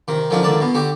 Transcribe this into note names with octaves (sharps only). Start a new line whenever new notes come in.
C3 D#3
D3 D#3 F3 C#4 D4
C#2 D3 D#3 D5 A5
B2 B3
D3 F#4 G4